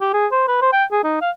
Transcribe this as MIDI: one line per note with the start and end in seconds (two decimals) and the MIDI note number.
0.01 0.11 67
0.14 0.27 68
0.32 0.46 72
0.48 0.61 71
0.62 0.71 72
0.73 0.84 79
0.92 1.04 68
1.04 1.20 63
1.21 1.30 77